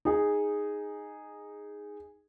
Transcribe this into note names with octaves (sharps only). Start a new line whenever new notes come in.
D#4 G#4